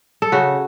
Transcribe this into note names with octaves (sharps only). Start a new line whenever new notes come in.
A4
C#3 F#4